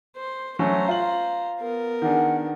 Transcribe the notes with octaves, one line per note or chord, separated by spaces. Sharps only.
C5
F#3 A3 C#4 C5 A#5
F4 F#7
B3 A#4
D#3 D4 G#4 F#5